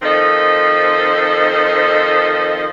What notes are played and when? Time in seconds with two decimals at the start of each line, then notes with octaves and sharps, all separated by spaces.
0.02 D#3 F3 C4 A4 C5 D#5